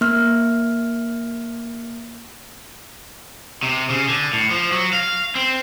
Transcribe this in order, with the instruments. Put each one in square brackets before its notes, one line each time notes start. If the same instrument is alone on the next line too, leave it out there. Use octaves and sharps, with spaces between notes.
[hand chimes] A#3 F6
[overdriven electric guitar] C3
C#3
D3
A2
F3
F#3
F5
C4